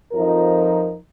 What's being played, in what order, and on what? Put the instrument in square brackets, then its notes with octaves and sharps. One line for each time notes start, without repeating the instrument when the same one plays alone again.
[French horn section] F2 F3 D#4 A#4